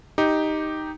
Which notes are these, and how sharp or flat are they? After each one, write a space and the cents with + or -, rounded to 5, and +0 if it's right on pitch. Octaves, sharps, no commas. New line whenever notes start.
D#4 +0 G4 +0